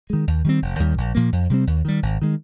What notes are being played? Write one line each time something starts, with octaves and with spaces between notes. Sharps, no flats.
D#3 G#3
D#2
D#3 G3 C4
F1
D#2 D#3 G3
A#1
A#2 F3 A#3
F2
C3 G3 C4
D#2
D#3 G3
G#1
D#3 G#3